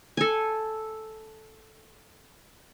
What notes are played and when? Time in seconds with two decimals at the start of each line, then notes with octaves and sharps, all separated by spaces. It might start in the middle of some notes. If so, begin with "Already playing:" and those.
0.17 A4 G#5